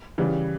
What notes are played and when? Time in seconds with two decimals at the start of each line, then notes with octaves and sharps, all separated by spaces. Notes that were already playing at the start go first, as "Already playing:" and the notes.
0.18 C#3 E3 G3